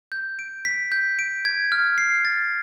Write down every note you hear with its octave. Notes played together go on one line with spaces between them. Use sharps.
G6
D7
B6
G6
D7
G#6
F6
C7
A6